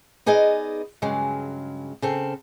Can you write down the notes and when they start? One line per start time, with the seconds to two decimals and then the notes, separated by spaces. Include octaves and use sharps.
0.26 B3 D#4 G#4 D5 D#5
1.02 G2 C#3 F#3 G#3
2.02 C#3 C4 A4